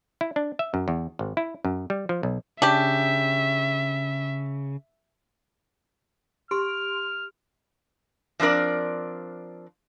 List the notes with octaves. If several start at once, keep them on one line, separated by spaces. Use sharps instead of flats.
E4
D4
E5
F#2
E2
G#1
E4
F#2
G3
F3
B1
C#3 D4 G4 E5
G4 C6 F6 D7
F3 C4 D4 A#4 D5